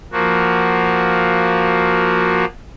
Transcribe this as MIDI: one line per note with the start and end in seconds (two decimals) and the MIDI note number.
0.12 2.45 53
0.12 2.45 58
0.12 2.45 66